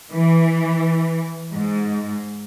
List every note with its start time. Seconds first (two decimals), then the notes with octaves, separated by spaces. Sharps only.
0.13 E3
1.54 G#2